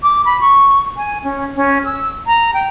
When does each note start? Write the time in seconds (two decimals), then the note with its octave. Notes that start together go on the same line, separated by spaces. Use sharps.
0.03 D6
0.25 B5
0.41 C#6
0.97 G#5
1.24 C#4
1.56 C#4
1.85 E6
2.27 A#5
2.54 G5